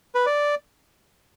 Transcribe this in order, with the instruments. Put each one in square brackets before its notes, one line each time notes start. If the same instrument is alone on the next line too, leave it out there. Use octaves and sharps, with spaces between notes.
[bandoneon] B4
D5